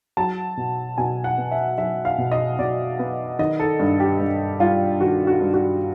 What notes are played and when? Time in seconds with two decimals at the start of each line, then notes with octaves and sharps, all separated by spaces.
0.17 F#3 A5
0.57 B2
0.98 B2 G#5
1.24 F#5
1.38 B3
1.51 E5
1.78 F#3 E5
2.05 F5
2.18 B2
2.32 D#5
2.59 B2 D5
2.99 B3
3.39 D#3 D#5
3.60 A4
3.79 G2
4.00 G4
4.20 G2
4.60 G3 F4
5.01 D#3 F#4
5.27 F#4
5.41 G2
5.54 F#4